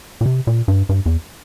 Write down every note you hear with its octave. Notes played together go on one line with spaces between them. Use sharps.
A#2
C3
A#2
G2
G2
E2